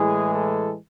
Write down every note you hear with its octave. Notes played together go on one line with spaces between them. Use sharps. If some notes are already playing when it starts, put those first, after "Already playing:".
Already playing: A2 E3 G#3 G#4
A4